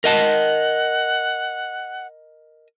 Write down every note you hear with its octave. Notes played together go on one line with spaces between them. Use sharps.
A#4 D#5 F#5 A5